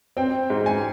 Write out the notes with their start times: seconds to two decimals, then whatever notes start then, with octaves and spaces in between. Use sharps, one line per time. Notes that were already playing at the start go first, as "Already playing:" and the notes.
0.17 C4 G5
0.50 G#2
0.66 G#5